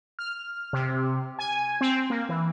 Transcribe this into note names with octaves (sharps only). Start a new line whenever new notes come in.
F6
C3
G#5
C4
A#3
E3